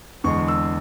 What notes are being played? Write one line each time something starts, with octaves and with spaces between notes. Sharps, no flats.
E2 D3 G#3 C#6
E6